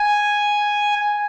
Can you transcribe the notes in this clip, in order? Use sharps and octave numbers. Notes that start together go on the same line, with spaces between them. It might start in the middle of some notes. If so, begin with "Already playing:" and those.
Already playing: G#5